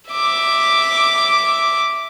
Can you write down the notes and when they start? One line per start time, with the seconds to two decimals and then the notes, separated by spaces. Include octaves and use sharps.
0.11 E5 D6